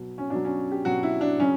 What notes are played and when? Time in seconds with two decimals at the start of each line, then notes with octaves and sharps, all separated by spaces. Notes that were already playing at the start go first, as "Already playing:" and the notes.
Already playing: B2 F#3
0.18 C#4
0.30 B2 F#3 D4
0.44 C#4
0.72 G4
0.85 B2 F#3 F#4
1.03 E4
1.21 D4
1.39 C#3 F#3 C#4